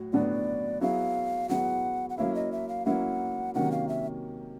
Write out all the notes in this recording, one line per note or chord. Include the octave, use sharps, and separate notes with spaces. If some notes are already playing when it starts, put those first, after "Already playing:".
Already playing: A2 F#3 F#4
A2 F#3 B3 D4 F#4 D5
F#3 B3 E4 G#4 F5
F#3 B3 E4 G#4 F#5
F#5
F#3 A#3 C#4 E4 F5
D#5
E5
F5
F#3 A#3 C#4 E4 F#5
C3 D#3 F#3 A#3 C#4 F#5
F5
E5